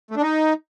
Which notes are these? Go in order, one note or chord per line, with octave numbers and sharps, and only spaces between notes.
A3
D4
D#4